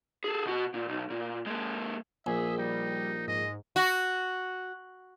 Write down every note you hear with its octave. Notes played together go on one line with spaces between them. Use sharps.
G#4 A4
B2 F#4
A#2
B1
A#2
G#3 A#3
A#1 G#4 E5
G3 D#4
G#2 D#5
F#4